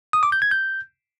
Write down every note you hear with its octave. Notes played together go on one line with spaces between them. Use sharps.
D#6
D6
G6
G#6
G6